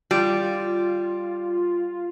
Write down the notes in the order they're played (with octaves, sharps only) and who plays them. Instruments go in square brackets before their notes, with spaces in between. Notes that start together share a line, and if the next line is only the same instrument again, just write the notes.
[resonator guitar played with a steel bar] G3 [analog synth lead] F4